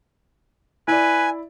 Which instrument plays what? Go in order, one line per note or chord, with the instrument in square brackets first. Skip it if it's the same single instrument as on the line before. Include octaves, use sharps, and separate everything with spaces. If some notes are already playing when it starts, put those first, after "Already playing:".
[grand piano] E4 D5 [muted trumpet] B4 [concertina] G#5